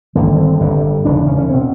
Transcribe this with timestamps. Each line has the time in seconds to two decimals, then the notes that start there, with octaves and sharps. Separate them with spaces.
0.15 G#1 G2 D3 A#3
0.38 C4
0.60 G1 G2 D3
1.05 E1 D#2 C#3 D4
1.16 D4
1.27 C#4
1.39 C#4
1.50 B2 C4